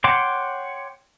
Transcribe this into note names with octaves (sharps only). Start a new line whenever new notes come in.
C#5 F#5 G5 C6 D6